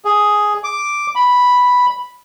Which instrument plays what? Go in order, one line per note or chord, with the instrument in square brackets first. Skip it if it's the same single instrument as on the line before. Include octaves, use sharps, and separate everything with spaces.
[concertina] G#4
D6
B5